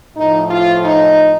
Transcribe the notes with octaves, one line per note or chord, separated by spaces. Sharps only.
A2 F3 D#4
F4
D#4